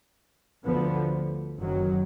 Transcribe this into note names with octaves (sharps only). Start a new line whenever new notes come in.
D2 D3 F3 B3
F#1 F#2 D#3 F#3